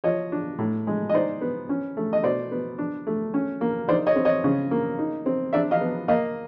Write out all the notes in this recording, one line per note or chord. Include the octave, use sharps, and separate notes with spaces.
F3 C#5 D#5
D4
A2
G#3
D#5
D#4 C5 D5
B3
C#4
A3
D#5
B2 C5 D5
B3
D4
A3
C#4
A#3
D#4 C5 D5
C#5 D#5
C4
C#5 D#5
C#3
A#3
D#4
C4
D4 D5 E5
D#5 F5
B3
A#3 D#5 F5